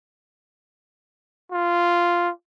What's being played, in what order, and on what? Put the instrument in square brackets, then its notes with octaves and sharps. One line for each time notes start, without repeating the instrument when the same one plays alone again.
[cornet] F4